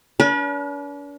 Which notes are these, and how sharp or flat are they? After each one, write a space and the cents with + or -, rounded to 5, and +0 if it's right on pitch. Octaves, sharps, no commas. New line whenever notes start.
D4 -45 B4 -40